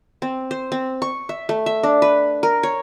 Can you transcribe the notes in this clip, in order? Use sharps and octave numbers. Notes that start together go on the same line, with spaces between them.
C4
C5
C4
C#6
E5
A3
E5
D4
B4
A#4
C#5